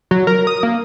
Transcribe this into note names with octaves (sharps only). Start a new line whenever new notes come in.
F#3
A#4
D#6
A#3